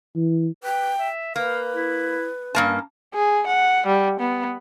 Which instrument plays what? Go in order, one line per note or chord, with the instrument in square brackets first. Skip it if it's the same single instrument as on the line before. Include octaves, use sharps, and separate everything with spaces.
[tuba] E3
[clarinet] B4 [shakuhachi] G5
[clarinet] E5
[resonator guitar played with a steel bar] A#3 [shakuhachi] B4 [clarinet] F5
[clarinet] E4
[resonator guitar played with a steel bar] G2 A#3 A5 [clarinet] C#4
[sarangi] G#4
F#5
G3
B3